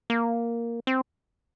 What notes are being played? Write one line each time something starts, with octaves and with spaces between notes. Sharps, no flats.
A#3
C4